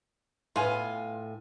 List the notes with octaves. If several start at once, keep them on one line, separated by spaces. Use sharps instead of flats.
A2 B3 F4 G#5